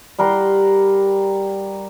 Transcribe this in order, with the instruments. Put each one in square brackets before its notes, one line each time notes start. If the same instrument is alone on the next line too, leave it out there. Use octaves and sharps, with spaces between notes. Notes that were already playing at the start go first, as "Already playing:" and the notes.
[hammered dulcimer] G3 A#4 F#5 C6